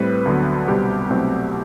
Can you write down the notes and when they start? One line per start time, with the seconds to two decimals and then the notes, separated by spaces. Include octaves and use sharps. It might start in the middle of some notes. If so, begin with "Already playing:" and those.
Already playing: A2 G3 C4 B4
0.25 D2 D3 F#3 B3
0.68 C2 B2 G3 C4 G4
1.10 C2 B2 F#3 A3 C4